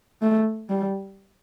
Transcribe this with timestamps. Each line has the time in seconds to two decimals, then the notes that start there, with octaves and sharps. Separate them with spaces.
0.22 A3
0.69 G3